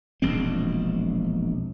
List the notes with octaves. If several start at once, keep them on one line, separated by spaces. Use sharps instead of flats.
E1 A#1 G#3 C4